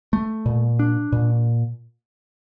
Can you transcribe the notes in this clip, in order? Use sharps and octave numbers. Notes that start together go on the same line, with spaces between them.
A3
A#2
D4
A#2